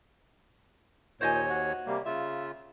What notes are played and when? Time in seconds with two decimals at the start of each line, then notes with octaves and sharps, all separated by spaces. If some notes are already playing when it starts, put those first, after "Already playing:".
1.21 D#2 A#2 C5 C#5 D#5 G#5
1.50 F#4
1.87 C3 G3 A#3
2.05 C#3 F4 E5